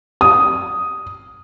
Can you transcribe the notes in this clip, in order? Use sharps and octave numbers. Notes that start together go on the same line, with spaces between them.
D#6